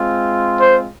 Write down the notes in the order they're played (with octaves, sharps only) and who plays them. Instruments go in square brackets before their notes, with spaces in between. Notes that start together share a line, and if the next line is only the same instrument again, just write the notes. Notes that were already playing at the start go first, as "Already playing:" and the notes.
Already playing: [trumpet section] G#3 C4 F4
C5